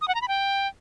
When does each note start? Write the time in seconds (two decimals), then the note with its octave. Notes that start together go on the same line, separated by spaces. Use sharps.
0.01 D#6
0.08 F#5
0.15 A#5
0.21 B5
0.28 G5